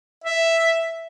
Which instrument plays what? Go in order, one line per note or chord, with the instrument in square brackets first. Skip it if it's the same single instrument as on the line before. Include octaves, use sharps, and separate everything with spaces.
[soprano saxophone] E5